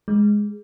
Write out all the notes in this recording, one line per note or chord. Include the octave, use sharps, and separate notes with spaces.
G#3